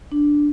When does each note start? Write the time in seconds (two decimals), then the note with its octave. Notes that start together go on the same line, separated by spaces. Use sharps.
0.12 D4